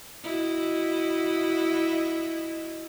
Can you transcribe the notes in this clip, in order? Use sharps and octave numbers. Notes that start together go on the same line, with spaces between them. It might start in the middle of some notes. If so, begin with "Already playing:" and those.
E4 F#4 D#5